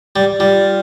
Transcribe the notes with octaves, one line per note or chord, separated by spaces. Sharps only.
G3
G3 F4